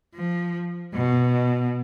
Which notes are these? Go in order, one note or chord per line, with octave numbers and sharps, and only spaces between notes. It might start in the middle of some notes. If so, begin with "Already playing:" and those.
F3
B2